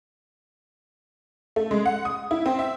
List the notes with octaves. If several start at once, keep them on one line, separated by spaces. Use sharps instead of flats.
A3
G#3
F#5
D#6
E4
C4
E5